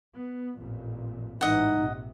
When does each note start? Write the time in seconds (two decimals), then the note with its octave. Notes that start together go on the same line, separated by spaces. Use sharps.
0.16 B3
0.57 A1 F2 A#2
1.41 A1 G#2 E3 D#4 D#5 F#5
1.77 A#1 C3